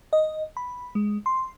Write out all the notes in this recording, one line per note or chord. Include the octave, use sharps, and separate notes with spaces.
D#5
B5
G#3
C6